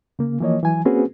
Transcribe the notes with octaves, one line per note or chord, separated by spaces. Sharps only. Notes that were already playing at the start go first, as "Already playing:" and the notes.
C#3 A#3
E3 F3 A#3 C#5 D#5
E3 F#3 G#5
A#3 C4 C#4 F#4 G#4 B4